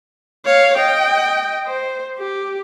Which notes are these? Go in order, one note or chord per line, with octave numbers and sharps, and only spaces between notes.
C#5 F5
D#5 G5
C5
G4